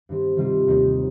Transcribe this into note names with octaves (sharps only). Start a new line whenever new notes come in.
G2 D#3 C4
C3 D#3 G3 C4 F4
D#2 D#3 A#3 D#4